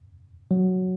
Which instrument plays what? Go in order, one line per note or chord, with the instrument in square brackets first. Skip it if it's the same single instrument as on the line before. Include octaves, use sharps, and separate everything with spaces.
[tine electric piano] F#3